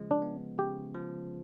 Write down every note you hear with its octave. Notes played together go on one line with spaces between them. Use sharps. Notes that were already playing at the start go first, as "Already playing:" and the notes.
Already playing: C#3 F3 G#3
D4
B3
C#3 G4
F3